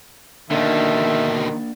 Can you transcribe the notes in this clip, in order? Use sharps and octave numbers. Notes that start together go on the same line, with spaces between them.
B2 D3 D#3 A#3 D4 A#4 E5